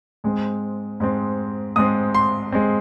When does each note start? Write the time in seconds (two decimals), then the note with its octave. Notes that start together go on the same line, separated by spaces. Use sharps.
0.24 G#2 G#3 C4
1.00 G#2 G#3 C4
1.76 G#2 G#3 C4 D#6
2.14 C6
2.52 G#3 C4